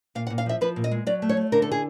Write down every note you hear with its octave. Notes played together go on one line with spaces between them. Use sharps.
A#2 F5
F#5
A#2
F5
F3 E5
F3 B4
A#2
D#5
G#3
F#3 D5
A3
C#5
A3
D3 A#4
A4
G#4